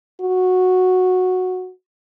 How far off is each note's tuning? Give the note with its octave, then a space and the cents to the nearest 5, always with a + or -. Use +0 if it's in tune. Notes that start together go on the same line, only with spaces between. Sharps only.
F#4 -10